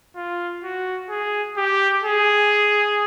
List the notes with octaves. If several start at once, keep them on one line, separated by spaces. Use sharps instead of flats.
F4
F#4
G#4
G4
G#4